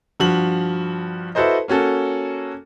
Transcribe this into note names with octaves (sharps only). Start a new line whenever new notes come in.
G2 F3 F#4 F#7
E4 F#4 A4 B4 C5 D#5
A#3 C#4 F#4 A4